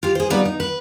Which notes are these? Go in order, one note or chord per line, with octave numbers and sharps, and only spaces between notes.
F4 G4
G#4 C5
G3 B3 D#4 F4
D#4
B4